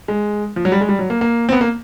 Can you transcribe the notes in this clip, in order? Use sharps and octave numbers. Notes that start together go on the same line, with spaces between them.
G#3
F3
F#3
G3
G#3
G3
F#3
A#3
A#3
C4
B3
A#3